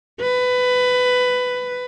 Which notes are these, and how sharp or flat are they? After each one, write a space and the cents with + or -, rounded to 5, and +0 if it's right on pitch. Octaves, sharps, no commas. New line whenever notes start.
B4 +15